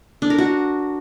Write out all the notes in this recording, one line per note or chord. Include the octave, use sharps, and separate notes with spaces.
D4
A#4
F#4